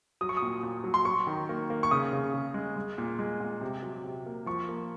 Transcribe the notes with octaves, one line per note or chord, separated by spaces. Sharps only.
F#3 D#6
C#6
D#6
A#2
A#2
F#3
C6
F#3 C#6
D#3
A#3
A#3
C#6
C#3 D#6
C#3
C#3
G#3
G#3
A#2
G#3
A#2
C3
F#3
C3
A#3
F3 C#6
A#3